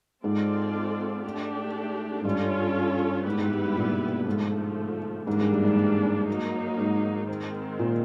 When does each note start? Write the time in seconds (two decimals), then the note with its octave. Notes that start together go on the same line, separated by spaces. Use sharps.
0.24 G#2 G#3 C4 F4 A4 D5
1.24 A3 D4 G4
2.21 G#2
2.25 G2 C#4 F4 A4 C#5
3.25 G#2 G3 B3 E4 G4 B4
3.39 G#2
3.51 G#2
3.64 G2
3.77 A#2
3.88 A#2
3.93 B2
4.27 G#2 D3 F3 A3
5.27 G#2 E3 G3 A#3 D4
5.40 G#2
5.53 G2
5.65 G#2
6.28 F#3 A#3 D#4
6.78 G#2
7.29 D#3 G#3 C4
7.79 A#2